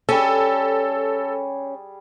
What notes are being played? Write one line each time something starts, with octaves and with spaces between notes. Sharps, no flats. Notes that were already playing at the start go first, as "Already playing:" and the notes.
G3 C#4 G#4 A4